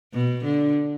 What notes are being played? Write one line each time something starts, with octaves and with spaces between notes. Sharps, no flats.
B2
D3